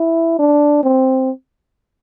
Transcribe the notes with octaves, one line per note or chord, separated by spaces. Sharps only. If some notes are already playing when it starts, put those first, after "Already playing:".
Already playing: E4
D4
C4